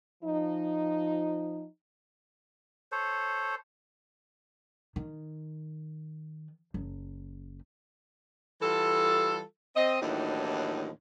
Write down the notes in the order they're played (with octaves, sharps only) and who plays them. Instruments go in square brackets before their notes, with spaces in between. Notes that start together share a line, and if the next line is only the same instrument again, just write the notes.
[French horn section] F3 D#4
[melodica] A4 C5 C#5
[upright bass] D#3
F#1
[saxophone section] E3 G3 F4 A4
C4 D#5
D#2 A2 E3 F#3 D4 D#4